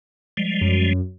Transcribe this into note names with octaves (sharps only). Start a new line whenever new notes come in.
F3 G3 G#3
F#2